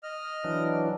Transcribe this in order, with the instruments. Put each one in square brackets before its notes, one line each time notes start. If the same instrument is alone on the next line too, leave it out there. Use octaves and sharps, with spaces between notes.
[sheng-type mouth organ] D#5 F6
[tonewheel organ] E3 F#3 D4 [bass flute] E4